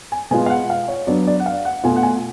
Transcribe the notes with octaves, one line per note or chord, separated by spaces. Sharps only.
G#5
B2 G#3 B3 F4 G#5
F5
F#5
F5
C#5
F#3 B3 D4 D5
D5
F#5
F5
F#5
B2 A3 F4 G#5
F#5
G#5